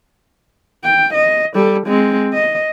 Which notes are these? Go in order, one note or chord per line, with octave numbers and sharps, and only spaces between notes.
G5
D#5
G3 A4
G#3 C4
D#5